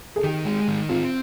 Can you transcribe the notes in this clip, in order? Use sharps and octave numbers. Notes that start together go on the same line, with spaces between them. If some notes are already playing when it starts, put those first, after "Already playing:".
G#4
D#3 G4
G#3
D#3
C4 F4